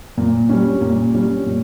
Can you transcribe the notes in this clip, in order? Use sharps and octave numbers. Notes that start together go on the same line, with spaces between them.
A#2
G3 C#4
A#2
G3 C#4
A#2